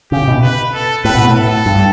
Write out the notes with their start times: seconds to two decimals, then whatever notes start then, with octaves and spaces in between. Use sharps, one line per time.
0.12 C#3 G4
0.27 B2
0.42 B4
0.74 A4
1.04 A2 B4
1.15 B2
1.25 A2
1.35 A4
1.66 G2